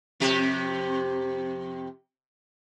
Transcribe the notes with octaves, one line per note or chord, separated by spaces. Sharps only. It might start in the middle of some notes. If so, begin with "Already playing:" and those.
F2 C3 G4